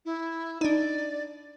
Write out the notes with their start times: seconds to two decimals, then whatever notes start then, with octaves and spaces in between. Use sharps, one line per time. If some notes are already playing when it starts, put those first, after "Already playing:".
0.05 E4
0.61 D4 D#4 D5